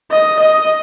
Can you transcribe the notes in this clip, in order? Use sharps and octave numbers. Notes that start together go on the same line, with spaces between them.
D#5
D#5